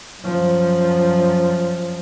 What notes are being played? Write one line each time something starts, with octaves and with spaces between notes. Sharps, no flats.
F#2 F3